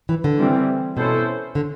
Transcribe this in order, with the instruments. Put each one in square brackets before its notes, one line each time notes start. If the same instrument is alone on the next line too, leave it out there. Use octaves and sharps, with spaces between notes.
[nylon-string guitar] E3
D3
[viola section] E3 G3 C4
[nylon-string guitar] B2 [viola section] C#4 E4 A4 C5
[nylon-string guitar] D3